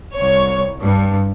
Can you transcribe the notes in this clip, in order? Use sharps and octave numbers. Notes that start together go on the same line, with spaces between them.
C2 C#5
G2